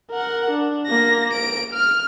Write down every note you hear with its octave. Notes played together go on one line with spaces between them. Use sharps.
A#4 F#5
D4
A#3 A#6
D7
F6